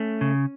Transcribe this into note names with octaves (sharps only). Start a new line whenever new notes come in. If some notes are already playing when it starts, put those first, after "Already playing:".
Already playing: A3 C#4
C#3